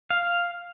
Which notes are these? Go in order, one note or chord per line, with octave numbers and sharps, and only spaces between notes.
F5